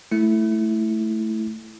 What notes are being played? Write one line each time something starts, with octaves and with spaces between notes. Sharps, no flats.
A3 E4